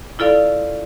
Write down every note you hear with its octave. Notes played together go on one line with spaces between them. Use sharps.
E4 F4 A4 D5 F5